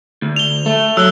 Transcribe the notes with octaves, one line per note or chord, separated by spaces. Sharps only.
D2
F7 G7
A3
F#3 E6 F#6 G7